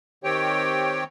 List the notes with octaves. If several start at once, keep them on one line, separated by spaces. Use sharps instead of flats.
D#3 C4 G4 C#5 G5